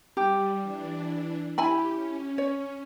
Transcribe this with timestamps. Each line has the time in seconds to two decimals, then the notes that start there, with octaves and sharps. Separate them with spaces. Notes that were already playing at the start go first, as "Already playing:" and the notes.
0.17 G3 G4
0.61 E3 D4
1.58 E4 G4 G#5 B5
1.88 C#4
2.38 C#5